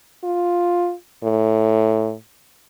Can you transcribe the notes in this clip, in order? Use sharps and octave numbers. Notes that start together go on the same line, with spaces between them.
F4
A2